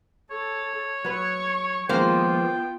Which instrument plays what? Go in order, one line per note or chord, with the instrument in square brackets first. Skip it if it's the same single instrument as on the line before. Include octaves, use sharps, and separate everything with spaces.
[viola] A4 [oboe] C#5
[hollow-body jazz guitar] F#3 B4 [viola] C#6
[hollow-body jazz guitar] D#3 F3 G#3 [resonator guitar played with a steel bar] A#3 C5 [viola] B3 F4 [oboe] G5